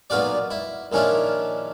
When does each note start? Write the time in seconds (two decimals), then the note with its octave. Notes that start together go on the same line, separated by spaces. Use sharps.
0.10 B1 A#2 B3 F4 F#4 D5
0.51 E4
0.92 A#1 D#3 C#4 D4 E4 F4